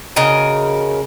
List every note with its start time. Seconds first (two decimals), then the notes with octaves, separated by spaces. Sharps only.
0.16 C#3 F#4 A#4 D#5